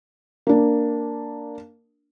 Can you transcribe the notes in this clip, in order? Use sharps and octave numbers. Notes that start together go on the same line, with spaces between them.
A#3 D4